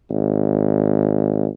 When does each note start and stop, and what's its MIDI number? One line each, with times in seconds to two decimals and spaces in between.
0.11 1.47 32